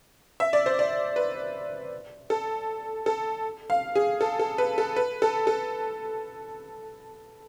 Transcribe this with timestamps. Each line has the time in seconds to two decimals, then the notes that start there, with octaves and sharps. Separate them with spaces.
0.40 E5
0.53 D5
0.66 C5
0.79 D5
1.16 B4
2.30 A4
3.06 A4
3.70 F5
3.95 G#4
4.21 A4
4.39 A4
4.58 B4
4.78 A4
4.96 B4
5.22 A4
5.47 A4